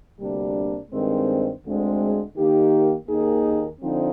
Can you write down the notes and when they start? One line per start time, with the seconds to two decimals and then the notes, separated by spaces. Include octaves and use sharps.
0.20 D2 C3 G3 A#3 D4
0.92 G2 D#3 G#3 C4
1.64 D2 D3 G#3 C4
2.37 D#3 A#3 D#4 G4
3.08 D#2 D#3 A#3 D#4 G#4
3.81 D3 F3 C4 D#4